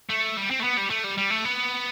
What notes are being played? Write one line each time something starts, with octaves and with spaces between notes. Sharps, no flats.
A3
G3
C4
A3
B3
G3
A3
G3
G3
A3
B3